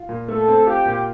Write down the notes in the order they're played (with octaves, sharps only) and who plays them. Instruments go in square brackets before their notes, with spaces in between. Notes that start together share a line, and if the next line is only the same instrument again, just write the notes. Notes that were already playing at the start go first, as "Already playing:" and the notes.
Already playing: [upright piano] F4
A#2
[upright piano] A3 [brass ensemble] A4
[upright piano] C4
[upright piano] F4 [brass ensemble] G4
[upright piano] A#2